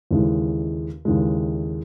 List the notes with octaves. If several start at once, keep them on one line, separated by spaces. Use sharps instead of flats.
D#2 C#3 E3 G#3
D#2 C#3 E3 G#3